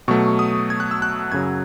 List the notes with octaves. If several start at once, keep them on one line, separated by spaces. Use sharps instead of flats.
B2 F#3 A3 C#6
D#6
G#6
F#6
E6
F#6
F#2 C#3 F#3 G#6